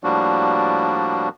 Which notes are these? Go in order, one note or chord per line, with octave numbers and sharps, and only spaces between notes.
A2 F3 G3 A#3 D4 F#4